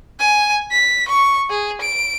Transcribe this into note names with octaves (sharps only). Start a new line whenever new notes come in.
G#5
B6
C#6
G#4
D7